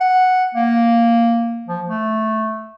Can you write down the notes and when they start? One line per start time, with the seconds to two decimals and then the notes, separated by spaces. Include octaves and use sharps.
0.01 F#5
0.55 A#3
1.68 F3
1.87 A3